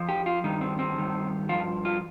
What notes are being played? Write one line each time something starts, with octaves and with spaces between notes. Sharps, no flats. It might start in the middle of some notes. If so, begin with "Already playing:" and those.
Already playing: F2 F3
G4
F4
G2 D#3 G3 D#4
C4
C4
G2 D#3 G3
G2 F3 F4
F4